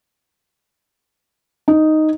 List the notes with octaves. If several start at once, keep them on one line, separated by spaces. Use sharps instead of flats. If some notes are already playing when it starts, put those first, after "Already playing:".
D#4